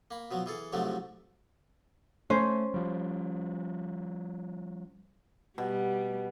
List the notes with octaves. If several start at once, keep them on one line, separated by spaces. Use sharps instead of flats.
A#3 B5
B2 F3 F#3
E3 G#4 A4
D2 G#2 C3 F3 F#3 A3
A3 C#4 C5
F3 G3
B2 G3